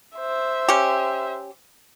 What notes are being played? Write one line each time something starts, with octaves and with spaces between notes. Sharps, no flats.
C5 E5
C#4 G4